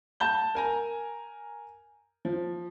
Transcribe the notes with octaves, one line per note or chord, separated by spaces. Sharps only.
A5 G6 G7
A#4 G#5 A#5
F3